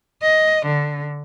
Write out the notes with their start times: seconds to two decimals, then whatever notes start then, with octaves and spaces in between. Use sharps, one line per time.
0.22 D#5
0.66 D3